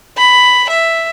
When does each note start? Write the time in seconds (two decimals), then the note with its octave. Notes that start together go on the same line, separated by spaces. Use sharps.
0.18 B5
0.70 E5